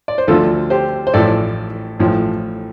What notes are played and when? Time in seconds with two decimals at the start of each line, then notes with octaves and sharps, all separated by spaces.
0.08 D5
0.18 C5
0.28 D2 D3 F3 F4 A4
0.70 G4 C5
1.07 C5
1.14 A1 A2 F3 A4 D5
1.99 A1 A2 F3